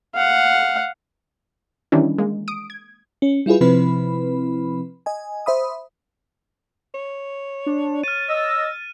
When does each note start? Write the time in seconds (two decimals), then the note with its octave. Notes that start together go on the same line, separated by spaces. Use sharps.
0.15 F5 F#5
1.92 D#3 E3 G3 C#4 D4 E4
2.18 G#3 A#3
2.48 D#6 D7
2.70 G#6
3.22 C#4
3.46 G3 E4 F4 G#4 B4
3.61 C3 F3 C4 E4 B4 B5
5.06 D#5 G#5
5.46 C5 E5 B5 D#6
6.94 C#5
7.66 D4
8.04 C#5 F6 A6 D#7
8.29 D#5 E6